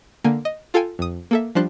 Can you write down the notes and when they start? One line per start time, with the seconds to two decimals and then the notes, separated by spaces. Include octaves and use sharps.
0.24 D3 A#3 G#5
0.45 D#5
0.74 F4 A4 F5 G5 G#5
0.99 F2 D#6
1.31 A#3 A4 E5
1.55 F3 G3 D4 C5 F#6